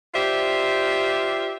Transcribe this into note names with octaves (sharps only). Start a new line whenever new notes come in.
F4 G4 C5 D5 E5